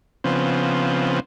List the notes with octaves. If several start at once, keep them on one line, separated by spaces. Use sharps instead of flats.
C#3 F3 B3 C4